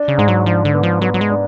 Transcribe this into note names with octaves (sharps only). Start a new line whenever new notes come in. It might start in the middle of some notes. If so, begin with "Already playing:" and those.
Already playing: D4
C#3
G#2 G#3
F#3
F3 D4
D3
B3
F3
F#3 B3
F#3
G#3
D4